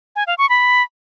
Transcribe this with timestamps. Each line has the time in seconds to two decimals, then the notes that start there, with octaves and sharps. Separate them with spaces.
0.16 G#5
0.27 F5
0.38 C#6
0.49 B5